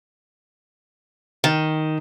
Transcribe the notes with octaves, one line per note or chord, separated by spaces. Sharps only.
D#3